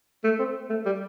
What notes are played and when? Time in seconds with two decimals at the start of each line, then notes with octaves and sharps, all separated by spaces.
0.24 A3
0.39 C4
0.70 A3
0.86 G3